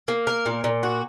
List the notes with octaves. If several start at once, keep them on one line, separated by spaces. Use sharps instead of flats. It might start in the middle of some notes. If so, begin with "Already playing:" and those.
A#3
A#4
A#2
A#2
F#4